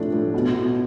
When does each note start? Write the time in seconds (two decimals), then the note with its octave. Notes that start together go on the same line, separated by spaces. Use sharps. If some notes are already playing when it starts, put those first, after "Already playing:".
Already playing: A2 C3 F3 D4
0.13 A2
0.34 B2
0.55 B2